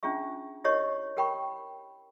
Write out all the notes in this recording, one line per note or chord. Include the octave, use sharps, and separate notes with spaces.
C#4 D4 F4 G#4 E5 C#6
E4 G4 A#4 C#5 D#5 C#6
G4 A#4 G5 B5 C#6